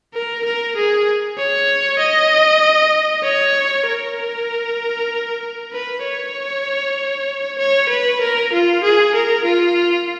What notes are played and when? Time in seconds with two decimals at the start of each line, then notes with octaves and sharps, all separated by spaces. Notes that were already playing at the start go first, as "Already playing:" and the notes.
0.14 A#4
0.44 A#4
0.76 G#4
1.38 C#5
1.99 D#5
3.24 C#5
3.87 A#4
5.72 B4
6.04 C#5
7.59 C#5
7.89 B4
8.21 A#4
8.53 F4
8.84 G#4
9.15 A#4
9.45 F4